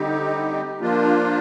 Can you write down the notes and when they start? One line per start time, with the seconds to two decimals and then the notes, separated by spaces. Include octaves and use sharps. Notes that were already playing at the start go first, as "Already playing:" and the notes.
Already playing: D3 G3 C4 D#4 G4
0.81 F3 A#3 D4 F4